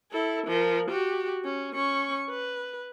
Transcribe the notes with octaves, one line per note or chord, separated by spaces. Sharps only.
E4 A4
F3 A#4
F#4 G4
C#4
C#4 C#6
B4